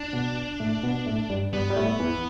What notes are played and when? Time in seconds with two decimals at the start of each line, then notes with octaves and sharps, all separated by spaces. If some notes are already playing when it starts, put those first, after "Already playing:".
Already playing: D4
0.13 B2 B3
0.60 A2 A3
0.83 B2 B3
1.06 A2 A3
1.30 G2 G3
1.53 G2 G3 B3
1.70 G3
1.76 A2 A3
2.00 E2 E3